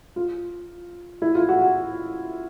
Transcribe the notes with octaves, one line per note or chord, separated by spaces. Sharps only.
F4
E4
F4
F#4
F#4